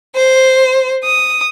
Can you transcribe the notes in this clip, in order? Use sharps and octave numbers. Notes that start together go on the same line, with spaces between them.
C5
D#6